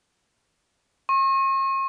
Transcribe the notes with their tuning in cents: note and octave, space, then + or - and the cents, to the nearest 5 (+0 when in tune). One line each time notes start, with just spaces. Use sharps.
C#6 -45